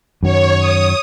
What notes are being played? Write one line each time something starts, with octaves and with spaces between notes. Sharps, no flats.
F#2 D#3 F#3 C#5
D#6